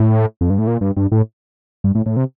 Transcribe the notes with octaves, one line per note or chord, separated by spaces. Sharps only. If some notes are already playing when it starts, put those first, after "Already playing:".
Already playing: A2
F2
G2
A2
A#2
G2
G2
A2
G2
A2
A2
C3